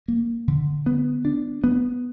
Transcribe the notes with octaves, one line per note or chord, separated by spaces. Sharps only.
A#3
D3
B3
D4
B3